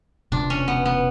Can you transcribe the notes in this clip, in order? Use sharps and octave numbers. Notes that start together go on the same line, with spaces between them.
E1 D2 C3 F3 D4
C#4
B3
B3